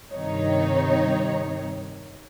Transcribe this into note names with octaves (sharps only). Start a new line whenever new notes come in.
G2 C3 D#3 D#4 C#5